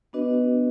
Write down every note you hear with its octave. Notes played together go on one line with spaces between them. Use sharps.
B3 D4 F#4 B4 D#5